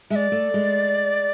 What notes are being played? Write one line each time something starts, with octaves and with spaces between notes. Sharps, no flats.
G#3 E5
D5
A3
G#3